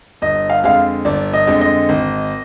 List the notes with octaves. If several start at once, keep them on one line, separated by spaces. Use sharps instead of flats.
G1 D#5
F5
F2 D3 G#3 F5
G1 D5
D#5
F2 D3 G#3
D#5
G#1